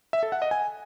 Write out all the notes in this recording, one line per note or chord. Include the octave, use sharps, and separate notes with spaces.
E5
A4
F#5
D#5
G#5